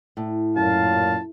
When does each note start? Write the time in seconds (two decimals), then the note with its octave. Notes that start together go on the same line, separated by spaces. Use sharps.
0.17 A2
0.57 F#2 A#2 F5 A5